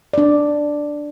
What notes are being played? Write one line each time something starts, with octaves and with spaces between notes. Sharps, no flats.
D4 D5